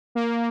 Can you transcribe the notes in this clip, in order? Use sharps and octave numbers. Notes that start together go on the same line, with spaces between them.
A#3